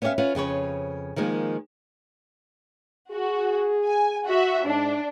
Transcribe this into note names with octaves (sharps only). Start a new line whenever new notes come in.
B3 C#4 G4 D5 E5 F5
C#4 F4 B4 F#5
F2 C#3 B4 C#5
D#3 F3 G#3 A#3
F#4 G#4
G#5
F#4 E5
G#2 D4